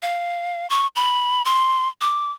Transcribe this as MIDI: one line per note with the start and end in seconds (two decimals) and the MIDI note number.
0.02 0.67 77
0.70 0.87 85
0.96 1.42 83
1.45 1.88 84
2.01 2.31 86